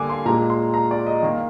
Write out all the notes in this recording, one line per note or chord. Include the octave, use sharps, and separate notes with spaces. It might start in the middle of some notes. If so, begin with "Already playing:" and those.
Already playing: D3 G3 A#3 G#5 D6
C6
A#2 G#3 A#5
C6
A#5
D5
D#5
D#3 A#3